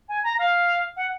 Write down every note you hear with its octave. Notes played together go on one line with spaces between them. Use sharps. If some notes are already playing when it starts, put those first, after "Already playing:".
G#5
A#5
F5
F#5